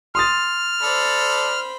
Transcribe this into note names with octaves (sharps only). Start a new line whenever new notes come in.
C6 D#6 F6 A6
A4 C5 D5 B5